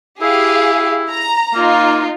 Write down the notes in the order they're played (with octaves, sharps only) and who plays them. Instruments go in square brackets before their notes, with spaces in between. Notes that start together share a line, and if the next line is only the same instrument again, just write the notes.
[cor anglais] E4 [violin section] G4 G#4 F5
[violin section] A#5
[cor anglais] A#3 [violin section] D#4 F4